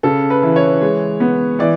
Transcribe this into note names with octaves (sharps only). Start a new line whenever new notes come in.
C#3 A4
B4
E3
C#5
G#3
B3
E3 D5